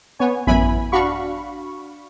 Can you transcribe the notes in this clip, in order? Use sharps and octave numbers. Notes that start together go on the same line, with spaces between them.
B3 C#5 G#5
A1 F#2 B3 E4 G#5 B5
D4 F#4 F5 B5 C#6